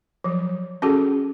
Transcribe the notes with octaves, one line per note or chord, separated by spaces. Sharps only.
F3 F#3
C#4 F#4 G#4 A4